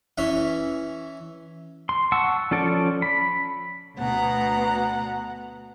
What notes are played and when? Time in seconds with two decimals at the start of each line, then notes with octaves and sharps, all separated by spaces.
0.18 E3 C#4 E5
1.89 C6
2.12 F#5 A5 C#6 E6
2.51 F3 C#4 A4 D5
3.02 B5
3.96 D2 B2 F#5 A#5